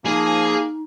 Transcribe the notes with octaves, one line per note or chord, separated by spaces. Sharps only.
F3 A#3 D#4 G#4 G#5